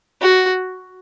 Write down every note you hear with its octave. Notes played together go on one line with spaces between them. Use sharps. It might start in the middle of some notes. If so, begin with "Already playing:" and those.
F#4